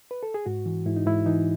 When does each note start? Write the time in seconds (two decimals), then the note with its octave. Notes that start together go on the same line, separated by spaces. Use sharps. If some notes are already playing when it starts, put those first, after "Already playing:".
0.11 B4
0.23 A4
0.34 G#4
0.46 G#2 F#4
0.66 E3
0.86 G#2 E4
0.96 D#4
1.06 G#2 E4
1.26 E3 D#4